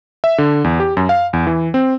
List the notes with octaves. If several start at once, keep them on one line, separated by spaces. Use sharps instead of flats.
E5
D3
E2
G4
F#2
F5
E2
E3
C4